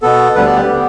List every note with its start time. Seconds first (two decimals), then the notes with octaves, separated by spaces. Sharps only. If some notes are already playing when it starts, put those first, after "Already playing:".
0.02 B2 B3 A4
0.35 D2 D3 G3 B3 B4
0.46 D5
0.56 G4
0.68 D3 B3